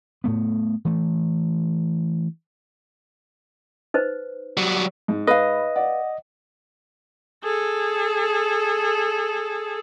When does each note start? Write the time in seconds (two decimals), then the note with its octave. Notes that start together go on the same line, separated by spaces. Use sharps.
0.24 A2 A3 B3
0.85 E3 A3
3.94 D#4 B4 C5
4.57 F#3 G3
5.08 G#2
5.27 B4 D#5 F5 B5
5.76 D5 F#5
7.44 G#4 A4